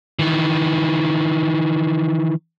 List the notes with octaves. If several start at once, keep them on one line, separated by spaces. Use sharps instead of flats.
D#3 E3